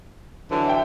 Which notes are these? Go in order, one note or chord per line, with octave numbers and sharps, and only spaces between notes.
D3 E3 F#3
E5 G5